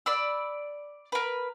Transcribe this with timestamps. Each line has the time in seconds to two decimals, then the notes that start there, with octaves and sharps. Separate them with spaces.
0.06 D5 B5 E6
1.12 A#4 B4